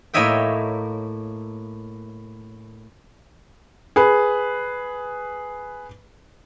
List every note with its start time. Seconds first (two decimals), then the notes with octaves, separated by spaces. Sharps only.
0.14 A2 A#3 C#5 D#5 E5 G5
3.96 G#4 B4